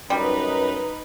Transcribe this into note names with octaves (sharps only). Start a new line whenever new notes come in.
F#2 G3 D#4 B4